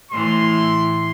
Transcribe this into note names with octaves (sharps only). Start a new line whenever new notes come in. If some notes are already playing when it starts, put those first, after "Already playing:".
A2 E3 C6